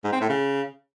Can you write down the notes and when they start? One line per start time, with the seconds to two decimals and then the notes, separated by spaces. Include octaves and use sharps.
0.04 G#2
0.13 C4
0.21 A2
0.29 C#3